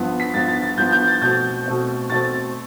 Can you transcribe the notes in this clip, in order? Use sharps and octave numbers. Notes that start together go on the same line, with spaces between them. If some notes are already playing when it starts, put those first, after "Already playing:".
Already playing: G2 F3 B3
B6
G2 F3 B3 A6
A6
A6
G2 F3 B3 G6
G6
A6
B2 A3 C4 G6
B2 A3 C4
B2 A3 C4 A6